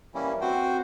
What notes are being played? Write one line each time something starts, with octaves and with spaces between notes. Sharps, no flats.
E3 G3 A#3 C#4 E4
C4 F#4 C5 G5